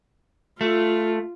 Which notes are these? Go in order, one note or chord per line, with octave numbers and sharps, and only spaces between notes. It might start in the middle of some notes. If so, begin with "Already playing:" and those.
A3 F4